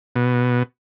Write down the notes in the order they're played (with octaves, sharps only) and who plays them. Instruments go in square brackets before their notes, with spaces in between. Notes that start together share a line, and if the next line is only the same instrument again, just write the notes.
[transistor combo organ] B2